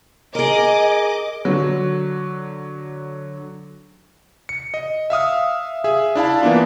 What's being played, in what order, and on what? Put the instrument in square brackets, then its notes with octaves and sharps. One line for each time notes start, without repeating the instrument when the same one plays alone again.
[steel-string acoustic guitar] G#4 A#4 [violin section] D#5 D6
[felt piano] D3 F#3
[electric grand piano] C#7
D#5
E5 F5 D#6 F6
G#4 E5
D4 E4 F5 A5
E3 A#3 B3 D4 F4